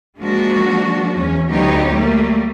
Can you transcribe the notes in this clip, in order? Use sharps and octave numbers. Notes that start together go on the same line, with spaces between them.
F3 G#3 A#3 D4 F#4
E2 C#4
D2 F#3 B3 D#4 G4 C#5
G3 A3 A#3